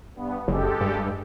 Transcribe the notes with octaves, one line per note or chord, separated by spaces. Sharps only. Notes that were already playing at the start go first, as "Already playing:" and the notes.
G2 B3
F#1 G#3 G4 A4
G2